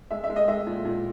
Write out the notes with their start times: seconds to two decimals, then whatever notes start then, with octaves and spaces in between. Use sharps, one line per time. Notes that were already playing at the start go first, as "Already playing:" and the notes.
0.11 G#3 E5
0.24 E5
0.30 G#3
0.36 D#5
0.48 G#3 E5
0.67 A#2
0.85 A#2